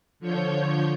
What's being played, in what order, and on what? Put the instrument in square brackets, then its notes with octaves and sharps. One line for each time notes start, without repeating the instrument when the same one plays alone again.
[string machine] D3 F3 C#5 G6